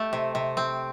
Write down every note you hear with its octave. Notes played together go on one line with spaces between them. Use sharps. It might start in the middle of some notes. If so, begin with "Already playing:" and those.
Already playing: A3 G4
C3
C3
C4